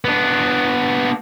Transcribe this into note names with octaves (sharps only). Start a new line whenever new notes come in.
B3 D4